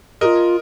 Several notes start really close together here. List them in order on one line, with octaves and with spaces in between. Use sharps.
G4 A#4 D#5 F4